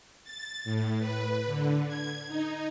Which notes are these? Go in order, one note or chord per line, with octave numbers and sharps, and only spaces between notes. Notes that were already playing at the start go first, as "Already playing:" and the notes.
A6
A2
B4
D3
G#6
D#4